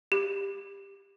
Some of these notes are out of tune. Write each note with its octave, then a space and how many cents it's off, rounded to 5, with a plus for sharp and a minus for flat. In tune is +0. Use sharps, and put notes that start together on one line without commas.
G4 +15